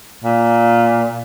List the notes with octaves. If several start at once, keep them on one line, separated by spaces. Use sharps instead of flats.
A#2